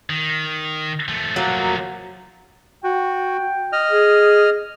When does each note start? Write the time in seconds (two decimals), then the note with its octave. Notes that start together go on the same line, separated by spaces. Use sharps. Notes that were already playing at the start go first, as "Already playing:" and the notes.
0.10 D#3
1.08 F3 A3
1.36 F#3 A#3 F#4
2.84 F#4 G5
3.73 D#5 F6
3.90 G#4